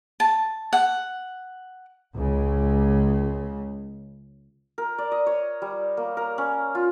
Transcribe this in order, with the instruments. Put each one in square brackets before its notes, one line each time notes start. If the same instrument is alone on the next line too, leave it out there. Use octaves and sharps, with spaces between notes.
[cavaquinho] A5
F#5
[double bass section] C#2 C#3
[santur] A#4
D5
D#5
C#5
G3
A#3
A#4
C#4
F4